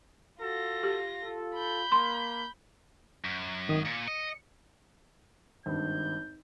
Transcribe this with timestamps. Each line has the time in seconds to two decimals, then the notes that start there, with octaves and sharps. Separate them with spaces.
0.41 F4 F#4 A4 A#6
0.83 G4
1.23 F4 A4
1.55 B5 G6
1.92 A#3 C6
3.25 F#2
3.68 G#1 D#3 D#6
3.85 A#2 C#7
4.08 D#5
5.66 G#1 G2 G6